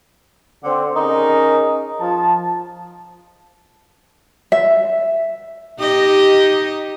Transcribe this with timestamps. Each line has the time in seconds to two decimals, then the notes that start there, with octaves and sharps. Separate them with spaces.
0.64 D3 C4
0.96 C#4 D#4 G#4 A#4 D#5
2.01 F3 A5
4.52 E5
5.79 D#4 G4 D#5